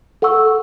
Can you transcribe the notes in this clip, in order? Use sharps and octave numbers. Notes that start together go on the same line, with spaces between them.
A4 F#5 C#6 E6